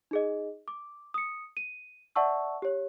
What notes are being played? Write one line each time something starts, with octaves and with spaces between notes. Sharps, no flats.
D#4 G#4 D#5
D6
D#6 C#7
D#7
D5 E5 F#5 A5 C#6 E6
G4 C#5